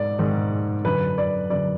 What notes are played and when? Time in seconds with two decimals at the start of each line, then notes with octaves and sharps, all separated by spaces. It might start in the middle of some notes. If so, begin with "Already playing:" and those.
Already playing: G#2 D5
0.19 G#2 D#3
0.84 F#2 D3 B4
1.18 D5
1.50 F#2 D3 D5